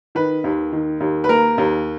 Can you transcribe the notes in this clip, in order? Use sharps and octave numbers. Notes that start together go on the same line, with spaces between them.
D#3 B4
D#2
D#3
D#2
B4
A#3 A#4
D#2